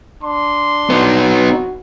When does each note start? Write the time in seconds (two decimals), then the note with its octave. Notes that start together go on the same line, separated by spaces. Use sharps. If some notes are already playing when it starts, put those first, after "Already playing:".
0.22 D4 C6
0.90 B3 D#4 F#4